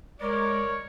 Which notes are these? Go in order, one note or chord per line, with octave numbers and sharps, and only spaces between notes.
G#3 A#4 C#5 D5